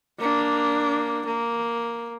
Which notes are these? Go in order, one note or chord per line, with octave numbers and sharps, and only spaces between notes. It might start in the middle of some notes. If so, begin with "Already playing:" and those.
A#3 D4
A#3